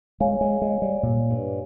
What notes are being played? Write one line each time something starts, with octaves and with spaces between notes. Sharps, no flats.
G#3 C#5 F5 G#5
G#3
G#3
G3
A#2
G2